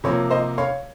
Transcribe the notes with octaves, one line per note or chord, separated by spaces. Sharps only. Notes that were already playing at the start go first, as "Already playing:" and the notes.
C3 F3 A#3 C#5
C5 D#5
C#5 F5